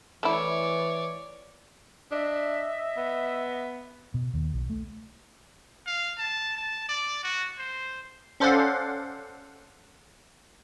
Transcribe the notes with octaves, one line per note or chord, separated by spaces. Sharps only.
E3 A3 E4 C#5 D5
D4 D#5 E5
B3
B2
D#2
B1
A3
F5
A5
A5
D5
F#4
C5
C#4 A4 C5 D5 F5 F#5